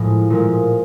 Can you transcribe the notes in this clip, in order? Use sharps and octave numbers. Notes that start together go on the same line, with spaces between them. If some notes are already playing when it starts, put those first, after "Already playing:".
Already playing: A2 F3 G#3
A#2 F3 G#3